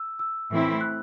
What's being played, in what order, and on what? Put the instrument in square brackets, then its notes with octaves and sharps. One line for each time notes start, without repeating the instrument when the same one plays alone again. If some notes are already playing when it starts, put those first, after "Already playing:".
Already playing: [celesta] E6
E6
[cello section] A2 E3 A3 C4 E4
[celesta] F#6